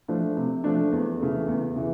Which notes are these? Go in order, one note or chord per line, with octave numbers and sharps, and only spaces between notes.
F3 A3 D4
C3
F3 A3 D4
E2
C#3 E3 A3
E2
C#3 E3